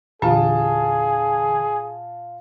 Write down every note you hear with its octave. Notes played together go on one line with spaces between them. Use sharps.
E2 A#2 D3 F4 G#4 A5